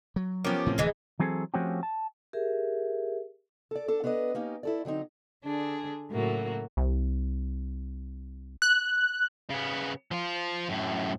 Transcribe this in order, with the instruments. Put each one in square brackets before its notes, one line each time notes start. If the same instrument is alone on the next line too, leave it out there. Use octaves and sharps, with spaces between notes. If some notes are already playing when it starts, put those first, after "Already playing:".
[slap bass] F#3
[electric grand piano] F3 C#4 A#4 [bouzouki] B3 G4
[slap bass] A2 C3 C4
[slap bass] D1 [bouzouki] E3 G#3 D#4
[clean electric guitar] E3 F#3 C4 G#4 A4
F3 A3 C4 C#4 F#4 G4
A5
[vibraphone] G4 G#4 A#4 E5
[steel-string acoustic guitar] A4 D5
D4 A4
B3 D4 B4 C#5 D#5
A#3 C#4 D#4 G4
E4 A4 D5
D3 F#3 C4 D#4
[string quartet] D3 D4 G#4
A2 C#3 F#3 A#3 F#4
[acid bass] C2
[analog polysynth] F#6
[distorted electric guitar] C#3 B3
F3 F4
F#2 A2